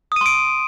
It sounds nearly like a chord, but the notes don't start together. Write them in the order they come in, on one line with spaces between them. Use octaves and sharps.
D#6 D#7 C6 D7